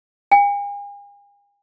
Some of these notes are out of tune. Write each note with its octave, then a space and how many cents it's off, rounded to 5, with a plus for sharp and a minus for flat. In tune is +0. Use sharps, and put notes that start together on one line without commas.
G#5 -45